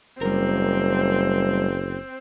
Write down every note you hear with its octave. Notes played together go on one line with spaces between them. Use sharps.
F#1 G3 C4 A#4